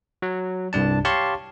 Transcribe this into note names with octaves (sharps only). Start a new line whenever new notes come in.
F#3
C2 G2 D4 A5
G4 C#5 F5 A5 C6 C#6